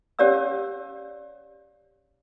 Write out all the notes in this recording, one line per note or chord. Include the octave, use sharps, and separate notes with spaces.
C#4 G4 C#5 D5 F5 E6